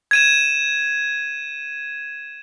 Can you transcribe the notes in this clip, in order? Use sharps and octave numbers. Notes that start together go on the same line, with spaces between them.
G#6 D#7 E7